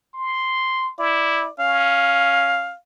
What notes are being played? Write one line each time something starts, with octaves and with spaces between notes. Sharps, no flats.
C6
E4 D5
C#4 F5